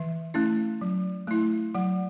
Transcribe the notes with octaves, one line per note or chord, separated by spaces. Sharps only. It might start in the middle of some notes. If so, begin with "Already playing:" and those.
Already playing: E3 E5
A3 C#4 E4
F#3
A3 E4
F#3 F#5